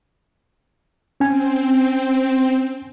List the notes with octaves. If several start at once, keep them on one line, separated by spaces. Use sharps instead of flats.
C4 C#4 G#5